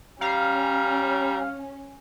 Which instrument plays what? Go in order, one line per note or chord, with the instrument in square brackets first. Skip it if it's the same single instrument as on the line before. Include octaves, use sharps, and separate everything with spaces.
[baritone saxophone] G3 [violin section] C#4 [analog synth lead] F5 [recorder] A#5